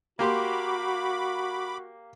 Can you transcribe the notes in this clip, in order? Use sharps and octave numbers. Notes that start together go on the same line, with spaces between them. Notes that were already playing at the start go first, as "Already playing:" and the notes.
A#3 F#4 G4 B5 C6 D6